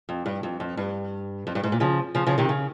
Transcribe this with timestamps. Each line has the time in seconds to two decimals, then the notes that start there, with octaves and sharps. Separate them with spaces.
0.09 F2
0.26 G2
0.43 F2
0.60 F2
0.77 G2
1.47 F2
1.55 G2
1.63 G#2
1.72 A#2
1.80 C#3 F3
2.15 C#3 F3
2.26 C#3 F3
2.38 C3 D#3
2.49 C#3